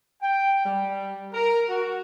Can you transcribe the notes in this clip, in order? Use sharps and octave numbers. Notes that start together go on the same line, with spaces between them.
G5
G3
A#4
F#4